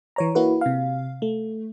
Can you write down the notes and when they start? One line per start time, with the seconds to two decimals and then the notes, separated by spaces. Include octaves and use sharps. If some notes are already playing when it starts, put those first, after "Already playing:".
0.16 E3 C#5 A#5
0.35 A#3 E4 F#4 B4
0.61 C3 F5
1.22 A3